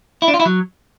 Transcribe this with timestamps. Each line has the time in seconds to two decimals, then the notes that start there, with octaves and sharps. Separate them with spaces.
0.22 E4
0.28 D4
0.34 F4
0.40 E4
0.46 F#3